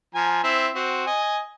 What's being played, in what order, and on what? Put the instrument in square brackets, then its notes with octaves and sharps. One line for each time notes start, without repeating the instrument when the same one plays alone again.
[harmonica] F3 G#5 A#5
C4 E4 E5
C4 F#4
D#5 G#5